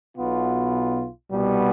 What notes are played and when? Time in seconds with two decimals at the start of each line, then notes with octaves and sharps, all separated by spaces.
0.17 B1 B2 B3 F4
1.30 C2 B2 G3 B3